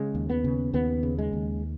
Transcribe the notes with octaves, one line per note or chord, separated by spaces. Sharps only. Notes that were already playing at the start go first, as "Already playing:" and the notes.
Already playing: C#3 G#3
D#2
B3
C#3
D#2 B3
C#3
G#3
D#2